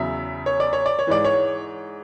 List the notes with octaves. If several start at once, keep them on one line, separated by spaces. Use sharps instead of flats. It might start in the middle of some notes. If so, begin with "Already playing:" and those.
Already playing: E2 C#3 F#3 E5
C#5
D5
C#5
D5
C#5
G#2 E3 D5
C#5